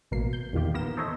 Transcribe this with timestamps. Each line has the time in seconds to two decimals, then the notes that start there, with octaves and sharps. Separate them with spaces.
0.11 A1 B2 A#3 C7
0.33 G6
0.53 E2 A#2 D#3 F4 G4
0.74 A#3 B3 A#4 A#6 E7
0.97 D#4 A4 C5 C#5 D#5 E5